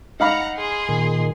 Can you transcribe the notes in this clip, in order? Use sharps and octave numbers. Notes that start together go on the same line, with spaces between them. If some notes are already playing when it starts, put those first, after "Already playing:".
D#4 F5 F#5 A#5 B5
G#4 C6
A#2 D#3